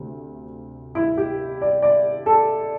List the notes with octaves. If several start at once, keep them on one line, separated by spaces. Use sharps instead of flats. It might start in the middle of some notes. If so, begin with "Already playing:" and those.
Already playing: D2 C3
E4
G4
D5
D5
A4